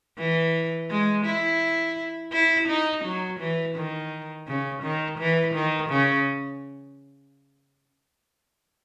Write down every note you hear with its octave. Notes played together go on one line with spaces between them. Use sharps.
E3
G#3
E4
E4
D#4
F#3
E3
D#3
C#3
D#3
E3
D#3
C#3